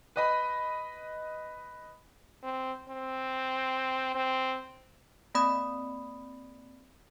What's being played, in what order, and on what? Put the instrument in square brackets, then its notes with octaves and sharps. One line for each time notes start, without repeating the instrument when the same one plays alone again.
[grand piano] B4 D#5 B5
[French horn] C4
C4
C4
[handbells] A#3 C4 D5 B5 D#6